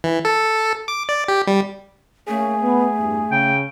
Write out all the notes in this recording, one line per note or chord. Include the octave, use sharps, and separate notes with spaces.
E3
A4
D6
D5
G4
G3
A3 A#3 C#4 G#4
B3
E2 G2
C#3 G5